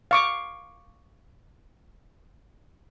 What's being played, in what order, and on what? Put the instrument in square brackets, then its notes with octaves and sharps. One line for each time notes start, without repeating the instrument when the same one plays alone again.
[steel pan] F5 C#6 D6